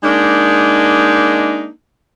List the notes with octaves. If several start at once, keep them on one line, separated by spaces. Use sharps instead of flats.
G#3 A#3 D4 D#4